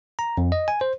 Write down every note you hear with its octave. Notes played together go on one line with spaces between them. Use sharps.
A#5
F2
D#5
G#5
C5